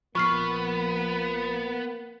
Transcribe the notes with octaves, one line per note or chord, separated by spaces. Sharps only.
A#1 A#2 F3 A#3 B3 C#6 F6 C7